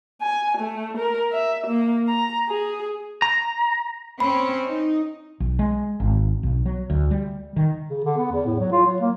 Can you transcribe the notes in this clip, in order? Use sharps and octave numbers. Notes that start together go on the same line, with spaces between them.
G#5
A3
A#4
E5
A#3
A#5
G#4
A#5
C4 C#4 B5
D#4
B1
G#3
G#1
B1
F#3
D2
G3
D#3
C#3
D3
B3
E2
A2
F#3
F4
F#3
A#3